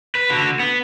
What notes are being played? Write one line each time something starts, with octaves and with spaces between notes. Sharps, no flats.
B4
D3 F#4
B3